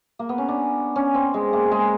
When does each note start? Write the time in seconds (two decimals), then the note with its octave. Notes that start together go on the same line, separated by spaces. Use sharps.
0.19 A#3
0.29 B3
0.38 C#4
0.48 D4
0.96 C#4
1.14 C4
1.34 G#3
1.53 A#3
1.72 G#3